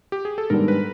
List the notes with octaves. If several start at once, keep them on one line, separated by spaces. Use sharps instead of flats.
G4
G#4
A4
G#2 D#3 G3 B3 D4 A#4
B4